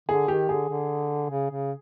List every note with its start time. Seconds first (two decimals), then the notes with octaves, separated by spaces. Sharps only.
0.08 D3 G#4
0.28 D#3 G4
0.49 D3 G#4
0.69 D3
1.30 C#3
1.50 C#3